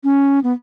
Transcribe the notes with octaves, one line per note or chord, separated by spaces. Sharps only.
C#4
B3